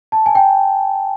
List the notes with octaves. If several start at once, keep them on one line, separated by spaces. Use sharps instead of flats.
A5
G#5
G5